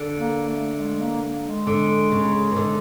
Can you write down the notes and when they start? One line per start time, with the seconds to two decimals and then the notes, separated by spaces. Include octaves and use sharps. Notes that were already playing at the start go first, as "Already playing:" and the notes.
Already playing: D3
0.18 A#3
0.48 A3
0.77 G#3
1.00 A#3
1.45 G#3
1.67 D3
2.12 C#3
2.51 D#3
2.56 D3